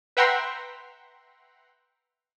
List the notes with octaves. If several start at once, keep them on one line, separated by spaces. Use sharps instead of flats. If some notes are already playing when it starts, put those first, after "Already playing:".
B4 E5 F#5 G5 A#5 C6